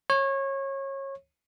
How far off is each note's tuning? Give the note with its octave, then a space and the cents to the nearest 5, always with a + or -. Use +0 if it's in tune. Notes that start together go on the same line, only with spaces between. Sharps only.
C#5 -25